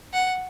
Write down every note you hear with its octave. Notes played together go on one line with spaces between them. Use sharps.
F#5